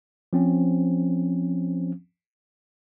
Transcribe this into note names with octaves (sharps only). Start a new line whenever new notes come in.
F3 C4 C#4